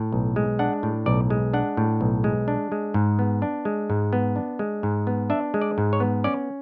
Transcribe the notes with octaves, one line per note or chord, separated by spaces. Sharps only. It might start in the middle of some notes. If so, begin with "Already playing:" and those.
Already playing: A2
B1
G#3
D4 F#5
A2
B1 D5
G#3
D4 F#5
A2
B1
G#3
D4
G#3
G#2
B3
D4
G#3
G#2
B3
D4
G#3
G#2
B3
D4 E5
G#3
D5
G#2
C#5
B3
C#4 D5